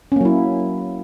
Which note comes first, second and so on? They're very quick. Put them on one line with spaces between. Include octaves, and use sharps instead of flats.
C#4 A#3 F#3 E4